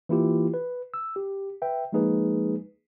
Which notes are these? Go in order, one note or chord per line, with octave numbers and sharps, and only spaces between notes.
E3 A#3 E4 F4 G4
B4
E6
G4
B4 E5 G5
F3 G#3 A#3 D#4 G#4 B4